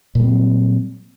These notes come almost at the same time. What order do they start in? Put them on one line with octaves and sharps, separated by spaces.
A#2 G3 C4 F#3